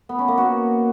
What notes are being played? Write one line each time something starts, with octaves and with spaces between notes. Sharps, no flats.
B3
C#4
A#3
F#4